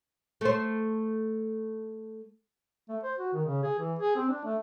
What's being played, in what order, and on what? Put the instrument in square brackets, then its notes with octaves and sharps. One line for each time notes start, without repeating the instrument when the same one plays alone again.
[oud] A3 C5
[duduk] A3
C5
F#4
D#3
C#3
G#4
E3
G#4
C4
D4
A3